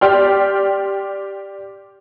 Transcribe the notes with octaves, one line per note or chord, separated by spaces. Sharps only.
G4 D5 G5 C6 F6